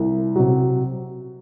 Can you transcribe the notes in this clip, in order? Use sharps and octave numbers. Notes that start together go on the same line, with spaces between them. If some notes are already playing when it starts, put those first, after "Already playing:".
Already playing: C2
C3 F#3